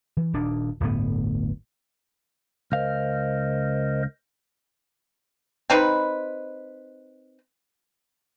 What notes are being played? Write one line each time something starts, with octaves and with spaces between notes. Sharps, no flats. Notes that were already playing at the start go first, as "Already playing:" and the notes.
E3
D#1 D#2 D4
D1 G1 A2 B3
C#2 A#4 C5 D#5 F5
C4 D#4 B4